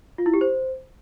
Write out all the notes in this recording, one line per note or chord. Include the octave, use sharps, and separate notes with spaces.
F4
E4
G4
C5